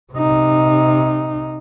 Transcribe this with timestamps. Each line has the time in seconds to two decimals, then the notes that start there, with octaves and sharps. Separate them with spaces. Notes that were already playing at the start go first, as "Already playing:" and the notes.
0.13 C3 D#4